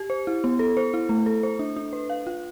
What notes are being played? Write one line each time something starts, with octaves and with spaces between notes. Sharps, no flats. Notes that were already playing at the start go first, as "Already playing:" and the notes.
Already playing: G4
C5
E4
B3
A4
C5
E4
A3
A4
C5
D4
D4
B4
F5
F4